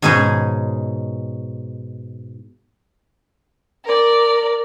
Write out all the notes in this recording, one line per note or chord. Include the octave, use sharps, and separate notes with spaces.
G#2 B2 G#3 C#4 D#4 G#4
A#4 D5